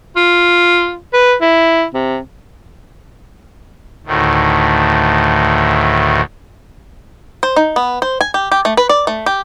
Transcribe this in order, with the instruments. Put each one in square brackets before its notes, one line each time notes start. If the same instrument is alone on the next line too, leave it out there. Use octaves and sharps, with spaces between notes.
[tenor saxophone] F4
B4
E4
C3
[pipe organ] D2 A2 D#3
[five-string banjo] C5
D#4
B3
C5
G#5
G4
G4
A3
B4
D5
A3
G4